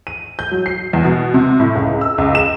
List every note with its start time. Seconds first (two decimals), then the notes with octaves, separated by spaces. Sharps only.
0.07 D#7
0.39 G6
0.52 F#3
0.66 C7
0.93 E2
1.05 B2
1.34 C3
1.60 A2
1.75 C#2
2.01 E6
2.18 C#2
2.35 E7